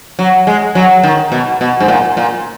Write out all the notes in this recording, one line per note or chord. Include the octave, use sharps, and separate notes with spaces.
F#3
G#3
F#3
D#3
B2
B2
G#2
A#2
A#2